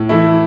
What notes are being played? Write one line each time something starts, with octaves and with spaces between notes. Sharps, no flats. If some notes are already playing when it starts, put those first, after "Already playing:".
Already playing: A2
E3 A3 E4